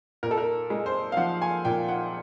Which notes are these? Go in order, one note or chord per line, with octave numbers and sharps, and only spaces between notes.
A#2 A#4
A4
A#4
G#3
C5
F5
F3 F#5
G#5
A#2 G5
F#5